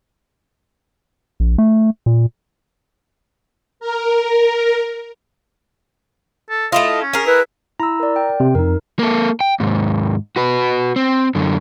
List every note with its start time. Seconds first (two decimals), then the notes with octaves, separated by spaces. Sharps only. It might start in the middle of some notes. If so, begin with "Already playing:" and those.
1.40 A#1
1.58 A3
2.06 A#2
3.80 A#4
6.50 A4
6.72 A3 E4 F4 D#5
7.02 C#4
7.13 G#4 A#4
7.26 E4 B4
7.80 E4 A#5 E6
8.00 A#4 D5
8.16 G5
8.40 C3
8.55 F2 D#4 A#4
8.99 A#3 A4
9.41 G5
9.60 D#2 G#2
10.36 F#4 B4
10.96 C4
11.35 F#2 D3